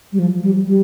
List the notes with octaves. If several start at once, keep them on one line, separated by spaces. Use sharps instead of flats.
G3
F3
G3
G3